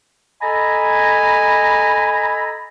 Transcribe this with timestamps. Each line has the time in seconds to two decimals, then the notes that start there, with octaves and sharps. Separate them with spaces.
0.42 A4 D#5 G#5 A#5 B5